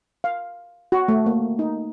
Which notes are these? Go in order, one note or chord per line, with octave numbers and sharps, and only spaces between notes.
F5
F#4
A3
A#3
D#4